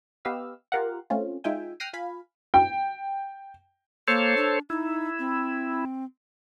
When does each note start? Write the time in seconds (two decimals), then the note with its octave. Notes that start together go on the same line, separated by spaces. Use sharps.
0.25 B3 G4 B4 D#5 F5 E6
0.72 F4 G4 A#4 F5 F#5
1.10 A3 C4 C#4 F4
1.44 G#3 D#4 F4 E5 G5 G#5
1.80 G5 F6 F#6 A#6 C7 D#7
1.93 F4 F5 G#5 B5
2.54 G5
4.08 A#3 A4 C5 C#5
4.37 D4
4.70 D#4 E4
5.19 C4